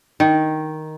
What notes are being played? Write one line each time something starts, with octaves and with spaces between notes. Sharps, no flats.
D#3